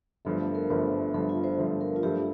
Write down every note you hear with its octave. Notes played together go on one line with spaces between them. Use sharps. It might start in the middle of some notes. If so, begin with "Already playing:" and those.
G1 G2 F3 A3 A4
A4
A#4
G1 G2 F3 A3 C5
G1 G2 F3 A3 A4
F4
C5
G1 G2 F3 A3
A#4
F4
G2 F3 A3 G4